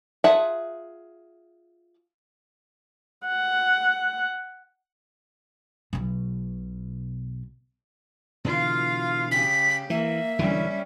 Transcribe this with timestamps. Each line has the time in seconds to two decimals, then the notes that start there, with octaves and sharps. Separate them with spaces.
0.24 F4 G#4 E5 F#5 A5
3.27 F#5
5.93 B1 B2
8.44 B2 D3 E3 F4 F5
9.31 C#3 G4 B6
9.90 E3 A#3 E5
10.39 E1 D3 E3 G3 C#4